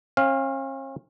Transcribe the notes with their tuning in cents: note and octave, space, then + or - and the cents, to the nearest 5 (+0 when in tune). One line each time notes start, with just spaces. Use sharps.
C#4 -45 F5 +0